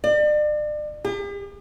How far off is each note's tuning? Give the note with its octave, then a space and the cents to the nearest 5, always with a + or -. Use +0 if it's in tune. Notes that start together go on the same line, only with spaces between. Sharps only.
D5 +40
G4 +45